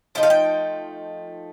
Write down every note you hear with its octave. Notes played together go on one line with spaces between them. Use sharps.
F3 A3 D#4 G5
F5
G5